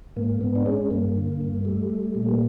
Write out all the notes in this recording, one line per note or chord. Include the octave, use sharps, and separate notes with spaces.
G#2 A#3
G#2 B3
D4
G#3 C#4
G2 A#3
D3
G2
G3 A3
G3
A#2
A#3